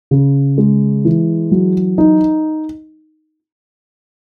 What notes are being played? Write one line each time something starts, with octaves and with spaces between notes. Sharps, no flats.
C#3
G#3
E3
F#3
D#4